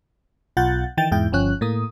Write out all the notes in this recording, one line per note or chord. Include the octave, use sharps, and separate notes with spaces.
B1 F4 F#5 G6 A6
D#3 E3 G5 A6
E2 G#2 E4 G5
G1 F3 C#4 F#6
A2 A#3 D#6